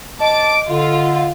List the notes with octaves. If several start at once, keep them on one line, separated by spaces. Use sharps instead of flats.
D#5 A5 D6 D7
D3 F4